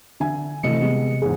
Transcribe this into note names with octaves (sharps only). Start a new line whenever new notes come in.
D3 E5 G#5
G#1 C3 E3 A3 D#5 C#7
G3 G#3 B3
E2 G#2 G#4